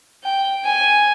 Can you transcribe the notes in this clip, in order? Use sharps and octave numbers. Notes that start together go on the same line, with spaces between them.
G5
G#5